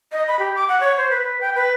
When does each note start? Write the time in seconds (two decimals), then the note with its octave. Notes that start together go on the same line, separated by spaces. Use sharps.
0.12 D#5
0.28 B5
0.39 G4
0.55 D6
0.68 F#5
0.80 C#5
0.97 C5
1.10 B4
1.22 B4
1.41 G5
1.55 B4